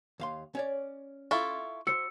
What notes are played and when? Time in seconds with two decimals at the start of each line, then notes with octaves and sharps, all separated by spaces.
0.20 D#2 F5 C6
0.55 C#4 C#5 D5
1.31 E4 F4 A4 C#6
1.87 F#4 C5 E6 C#7